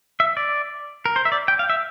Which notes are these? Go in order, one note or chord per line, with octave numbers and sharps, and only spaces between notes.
E5
D5
A#4
C5
E5
D5
G5
F5
E5